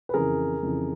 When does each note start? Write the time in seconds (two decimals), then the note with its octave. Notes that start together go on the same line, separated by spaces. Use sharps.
0.09 B4
0.14 F2 C#3 E3 G#4 A#4
0.63 F2 C#3 E3